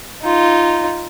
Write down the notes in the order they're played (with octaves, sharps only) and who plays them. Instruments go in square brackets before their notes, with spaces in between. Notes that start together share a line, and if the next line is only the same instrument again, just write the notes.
[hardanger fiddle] D#4 F4